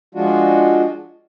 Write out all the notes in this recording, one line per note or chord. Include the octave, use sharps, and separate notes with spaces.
F3 G#3 D4 F4 F#4